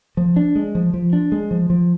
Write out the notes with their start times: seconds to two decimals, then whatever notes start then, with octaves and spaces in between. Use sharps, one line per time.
0.17 F3
0.36 D4
0.56 G#3
0.75 F3
0.94 F3
1.13 D4
1.32 G#3
1.51 F3
1.70 F3